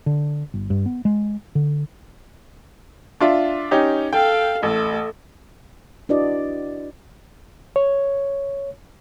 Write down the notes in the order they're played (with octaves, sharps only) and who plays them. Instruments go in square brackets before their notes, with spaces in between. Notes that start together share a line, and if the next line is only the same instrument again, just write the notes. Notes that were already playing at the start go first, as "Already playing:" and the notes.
[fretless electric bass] D3
G1
G2
B3
G#3
D3
[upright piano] D4 F4 E5
C#4 D#4 G4
[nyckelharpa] A4 F5 [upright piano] G5
[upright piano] A1 [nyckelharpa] A3 A4
[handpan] D4 E4 F#4 B4 D5 D#5
[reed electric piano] C#5